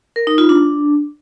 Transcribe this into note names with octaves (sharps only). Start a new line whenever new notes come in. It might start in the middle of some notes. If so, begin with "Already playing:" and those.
A#4
D#4
F4
D4